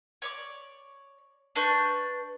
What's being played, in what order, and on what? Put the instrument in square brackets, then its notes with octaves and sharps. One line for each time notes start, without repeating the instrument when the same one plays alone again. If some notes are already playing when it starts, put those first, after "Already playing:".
[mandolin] C#5 D5 D6
D4 B4 C#6 G6